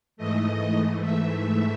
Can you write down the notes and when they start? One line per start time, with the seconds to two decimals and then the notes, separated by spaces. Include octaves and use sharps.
0.17 G#2 E3 A3 D#5
1.01 E5